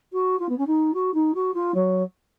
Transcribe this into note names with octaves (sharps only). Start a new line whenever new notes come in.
F#4
F4
B3
C#4
D#4
F#4
D#4
F#4
F4
F#3